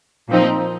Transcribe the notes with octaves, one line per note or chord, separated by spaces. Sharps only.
A#2 F3 C4 D#4